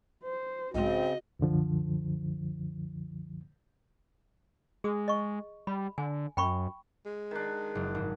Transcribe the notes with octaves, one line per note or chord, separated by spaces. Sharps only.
C5
B1 G#2 C#3 G#3 C4 F#4 D#5
C2 F#2 D3 F3
G#3 G#4 D#6
D#5 C#6
G3 B5
D3 G#5
F#2 G5 B5 C#6
G#3
D#3 D4
F#1
G#1